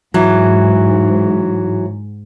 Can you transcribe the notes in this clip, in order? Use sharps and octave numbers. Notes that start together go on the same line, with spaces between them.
G#2 E3 F#3